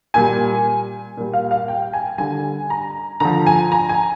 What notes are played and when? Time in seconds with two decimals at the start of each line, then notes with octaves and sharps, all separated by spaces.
0.14 A#2 G3 G#5
1.17 A#2 G3
1.33 F5
1.51 F5
1.68 G5
1.93 G#5
2.18 D3 G3 G#5
2.70 A#5
3.20 D3 F3 A#5
3.46 G#5
3.72 A#5
3.89 G#5